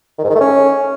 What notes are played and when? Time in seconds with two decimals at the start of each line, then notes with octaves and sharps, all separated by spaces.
0.19 D#3
0.24 G#2
0.30 D#3
0.35 A3
0.41 C#4